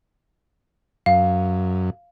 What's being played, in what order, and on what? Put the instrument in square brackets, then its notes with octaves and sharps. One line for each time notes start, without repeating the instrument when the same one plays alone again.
[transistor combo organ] F#2 [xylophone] F5